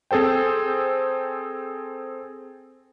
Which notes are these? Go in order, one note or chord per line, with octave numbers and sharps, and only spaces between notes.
C4 G#4 A4 C5 G5